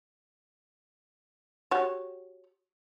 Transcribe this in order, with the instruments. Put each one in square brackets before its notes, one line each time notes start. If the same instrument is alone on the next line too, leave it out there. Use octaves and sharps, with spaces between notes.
[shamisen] F#4 G4 C#5